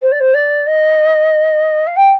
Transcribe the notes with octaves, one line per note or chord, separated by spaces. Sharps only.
C5
D5
C5
D5
D#5
F5
G5